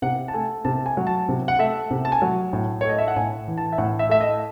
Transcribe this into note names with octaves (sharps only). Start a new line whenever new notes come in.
C3 F#5
A5
A3 G#5
C3 A5
G#5
F#3
A5
C3
F#5
A3 E5
C3
A5
G#5
F#3
A2
C#5
A3 D#5
E5
F#5
A2 G#5
E3
A5
E5
A2 F#5
E5
A3 E5
D#5